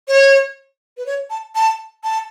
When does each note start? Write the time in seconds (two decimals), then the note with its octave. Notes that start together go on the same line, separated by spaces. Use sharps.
0.08 C#5
0.97 B4
1.06 C#5
1.30 A5
1.55 A5
2.04 A5